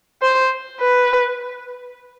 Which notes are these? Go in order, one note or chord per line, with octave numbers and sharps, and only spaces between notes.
C5
B4